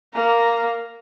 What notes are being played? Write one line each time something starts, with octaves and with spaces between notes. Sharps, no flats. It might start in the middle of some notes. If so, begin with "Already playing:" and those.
A#3 A#5